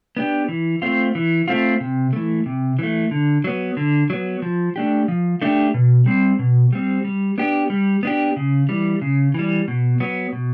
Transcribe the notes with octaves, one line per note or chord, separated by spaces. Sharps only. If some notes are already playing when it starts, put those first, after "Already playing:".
B3 D4 G4
E3
A3 C4 F4
E3
A3 C4 F4
C3
E3 A3
C3
E3 A3
D3
F#3 B3
D3
F#3 B3
F3
A3 D4 G4
F3
A3 D4 G4
B2
G3 C4
B2
G3 C4
G3
B3 D4 G4
G3
B3 D4 G4
C#3
E3 G3
C#3
E3 G3
B2
F#3 B3
B2